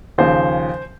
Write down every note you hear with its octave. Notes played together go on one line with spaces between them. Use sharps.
D#2 C#3 F3 C5